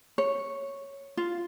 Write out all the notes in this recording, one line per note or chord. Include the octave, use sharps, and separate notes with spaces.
C#5
F4